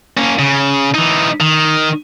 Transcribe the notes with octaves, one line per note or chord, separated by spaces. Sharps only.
A#3 C#4
C#3
E3 D#4
D#3